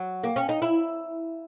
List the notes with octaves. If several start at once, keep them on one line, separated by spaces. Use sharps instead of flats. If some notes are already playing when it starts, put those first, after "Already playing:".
Already playing: F#3
A#3
C#4
D#4
E4